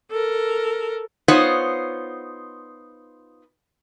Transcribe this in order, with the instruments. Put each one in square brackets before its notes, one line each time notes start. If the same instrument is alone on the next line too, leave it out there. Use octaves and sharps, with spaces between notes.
[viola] A4 A#4
[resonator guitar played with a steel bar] B3 D#4 F4 C5 C#5 F#5